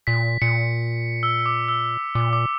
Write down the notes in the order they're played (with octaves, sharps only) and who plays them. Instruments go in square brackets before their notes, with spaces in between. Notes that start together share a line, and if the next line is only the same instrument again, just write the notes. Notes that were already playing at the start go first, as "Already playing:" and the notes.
[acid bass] A#2 [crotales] B6
[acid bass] A#2 [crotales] C#7
[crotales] E6
D6
E6
[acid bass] A#2 [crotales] D6
[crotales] D6